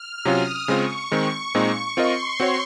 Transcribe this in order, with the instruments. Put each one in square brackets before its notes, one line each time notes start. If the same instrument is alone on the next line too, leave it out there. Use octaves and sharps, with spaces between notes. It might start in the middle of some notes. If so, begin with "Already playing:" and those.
Already playing: [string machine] F6
[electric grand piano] C3 F#3 C#4 F4 [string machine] D#6
[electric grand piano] C#3 G#3 C4 F4 [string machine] C#6
[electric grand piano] D#3 G#3 C4
A#2 G#3 C4 D#4
[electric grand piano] C4 F4 A#4 D#5 [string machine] C6
[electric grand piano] C4 F#4 C#5